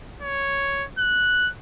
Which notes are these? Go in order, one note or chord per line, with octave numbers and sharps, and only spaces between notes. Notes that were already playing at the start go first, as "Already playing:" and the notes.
C#5
F#6